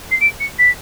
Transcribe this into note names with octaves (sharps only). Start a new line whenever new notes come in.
C7
D7
C#7
B6